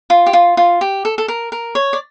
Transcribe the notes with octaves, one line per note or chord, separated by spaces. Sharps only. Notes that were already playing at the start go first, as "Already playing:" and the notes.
F4
G4
F4
F4
G4
A4
A4
A#4
A#4
C#5
D5